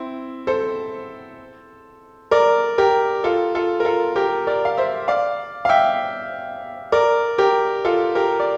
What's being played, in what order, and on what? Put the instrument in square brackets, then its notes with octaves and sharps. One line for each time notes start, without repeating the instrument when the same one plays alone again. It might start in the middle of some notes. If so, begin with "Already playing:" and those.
Already playing: [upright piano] C4 E4
A4 C5
A#4 D5
G4 A#4
F4 A4
F4 A4
A#4
F4 A4
G4 A#4
A#4 D5
F5
C5 E5
D5 F5
F5
E5 G5
A#4 D5
G4 A#4
F4 A4
G4 A#4
D5